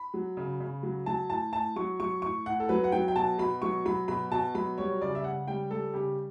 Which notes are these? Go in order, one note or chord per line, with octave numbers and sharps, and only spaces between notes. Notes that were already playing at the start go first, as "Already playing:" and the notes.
Already playing: B5
F#3
C#3
C#3
F#3
F#3 A5
A2 A5
A2 A5
F#3 C#6
F#3 C#6
A2 C#6
A2 F#5
A4
F#3 B4
F#5
F#3 G5
G5
B2 A5
B2 B5
F#3 C#6
F#3 B5
B2 B5
B2 A5
F#3 B5
G3 C#5
C#3 D5
E5
C#3 F#5
G3 G5
G3 A4
C#3 G4